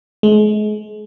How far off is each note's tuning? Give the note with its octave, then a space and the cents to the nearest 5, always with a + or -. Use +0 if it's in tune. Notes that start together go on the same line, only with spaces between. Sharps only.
G#3 +35